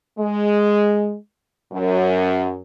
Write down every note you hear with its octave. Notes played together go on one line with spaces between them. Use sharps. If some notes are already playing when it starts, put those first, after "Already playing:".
G#3
F#2